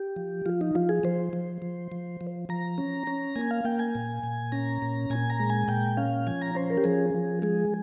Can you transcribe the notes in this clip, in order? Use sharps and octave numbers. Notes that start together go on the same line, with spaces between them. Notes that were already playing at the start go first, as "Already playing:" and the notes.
Already playing: G4
F3
F3 F4
D#4
F3 F4
G#4
F3 C5
F3
F3
F3
F3
F3 A#5
C#4
C#4
A#3 G#5
F5
A#3 G5
G#5
A#2
A#2
C#4 A#5
A#2
A#2 G#5
A#5
G#3
G#5
A#2 G5
C#4 F5
F3 G#5
A#5
C#4 C5
A#4
G4
F3 G#4
F3
G#3 G#4